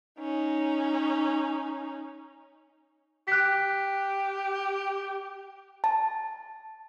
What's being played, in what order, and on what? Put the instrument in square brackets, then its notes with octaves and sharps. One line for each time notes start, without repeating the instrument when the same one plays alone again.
[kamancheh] C#4 D#4
[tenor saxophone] G4 [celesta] F#6 B6
[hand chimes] A5